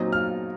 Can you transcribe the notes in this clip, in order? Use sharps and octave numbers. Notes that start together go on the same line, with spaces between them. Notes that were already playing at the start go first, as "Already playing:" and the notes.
Already playing: A#2 F#3 C4 D#4
F6